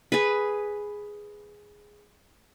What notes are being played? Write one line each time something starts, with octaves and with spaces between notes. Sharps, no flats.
G#4 B4